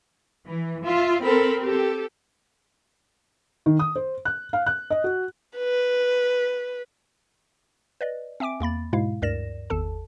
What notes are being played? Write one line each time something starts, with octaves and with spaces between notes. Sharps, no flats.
E3
F4 E5
C4 A4 A#4 B5
G4 A4
D#3
D#6
C5
F#6
F5
F#6
D#5
F#4
B4
B4 D5 D#5
C4 E5 G#5 D6 D7
E2 A#3 B5 A6
G#2 B2 G#3 E4 F5
D2 G2 A#4 D5 A#6 E7
G#1 E2 A4 A5